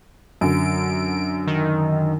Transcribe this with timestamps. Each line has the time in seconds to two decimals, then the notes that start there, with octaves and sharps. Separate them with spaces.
0.41 F#2 D3 D7
1.47 D#3